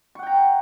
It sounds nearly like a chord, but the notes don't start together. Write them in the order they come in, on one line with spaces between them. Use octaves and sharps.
C#6 F#5 G5 A#5